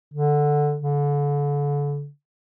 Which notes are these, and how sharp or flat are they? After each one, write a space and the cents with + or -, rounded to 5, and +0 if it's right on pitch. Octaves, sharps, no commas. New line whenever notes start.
D3 +5
D3 -35